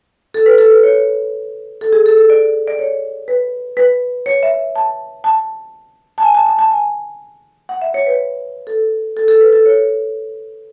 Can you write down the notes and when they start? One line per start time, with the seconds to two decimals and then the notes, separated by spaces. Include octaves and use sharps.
0.34 A4
0.46 B4
0.58 A4
0.71 B4
0.83 C#5
1.81 A4
1.93 G#4
2.06 A4
2.18 A4
2.30 D5
2.68 D5
2.79 C#5
3.28 B4
3.77 B4
4.26 C#5
4.43 E5
4.76 A5
5.24 A5
6.18 A5
6.22 G#5
6.34 A5
6.46 A5
6.58 A5
6.71 G#5
7.69 F#5
7.82 E5
7.94 C#5
8.06 B4
8.67 A4
9.17 A4
9.28 A4
9.41 B4
9.53 A4
9.66 C#5